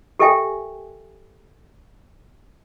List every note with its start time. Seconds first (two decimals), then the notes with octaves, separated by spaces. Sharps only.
0.19 G4 A4 A#4 E5 G5 G#5